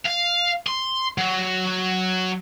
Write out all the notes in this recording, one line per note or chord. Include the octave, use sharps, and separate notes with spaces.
F5
C6
F#3